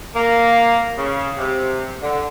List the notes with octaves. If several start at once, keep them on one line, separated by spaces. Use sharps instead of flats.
A#3
C#3
C3
D3